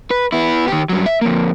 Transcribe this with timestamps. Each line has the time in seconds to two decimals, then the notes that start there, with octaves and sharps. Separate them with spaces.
0.11 B4
0.32 B3 E4
0.68 D#3 G4
0.89 G2 F#3
1.06 E5
1.21 F2 A#3